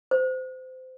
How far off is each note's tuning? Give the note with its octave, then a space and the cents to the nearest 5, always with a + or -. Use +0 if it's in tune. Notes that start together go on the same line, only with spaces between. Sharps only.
C5 -25